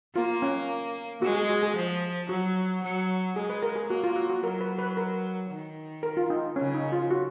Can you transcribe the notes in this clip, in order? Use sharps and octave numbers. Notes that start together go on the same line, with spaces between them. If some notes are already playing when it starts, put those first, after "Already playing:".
A#3 F4
C#4
G#3 F#4
G#4
F#4
G#4
F3
F#3 F#4
F#3
G#3 G#4
B4
A#4
G#4
A#3 F#4
F4
F#4
F#4
F#3 A#4
B4
B4
A#4
D#3
A#4
F4
D#4
C#3 C#4
D#4
F4
F#4